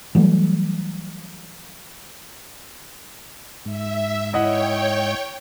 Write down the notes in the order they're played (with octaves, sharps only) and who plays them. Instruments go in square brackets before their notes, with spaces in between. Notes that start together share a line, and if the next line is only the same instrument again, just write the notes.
[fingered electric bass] E3 F#3 G3 A3
[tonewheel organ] G#2 [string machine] E5
[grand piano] E4 D#5 F#5 [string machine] C#5 G5